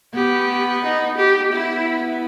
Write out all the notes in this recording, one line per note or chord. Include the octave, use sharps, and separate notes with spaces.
B3 G4
D#4
G4
B3 E4